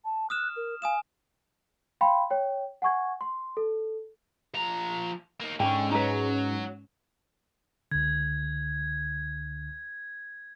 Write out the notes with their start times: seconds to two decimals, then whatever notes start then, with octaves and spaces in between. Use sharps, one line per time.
0.05 A5
0.30 D#6 F6 F#6 E7
0.56 A#4
0.82 F5 G#5 D#6 E7
2.01 F5 G5 B5 C6
2.30 C#5 G5
2.82 F#5 G#5 C#6 G#6
3.21 C6
3.57 A4
4.54 F3 A#5
5.40 A#3 D#4
5.60 G#2 D3 C#4 G5
5.91 F#3 D#4 B4
7.92 C#2 D3 G#6